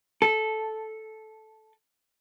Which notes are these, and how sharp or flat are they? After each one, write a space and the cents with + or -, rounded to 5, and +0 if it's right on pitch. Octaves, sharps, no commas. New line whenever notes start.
A4 -10